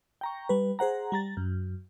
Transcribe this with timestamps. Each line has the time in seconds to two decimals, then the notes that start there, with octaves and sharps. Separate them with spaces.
0.21 G5 A#5 C#6
0.49 G3 B4
0.79 G#4 C5 F#5 A#5
1.12 G3 A#5 A6
1.37 F#2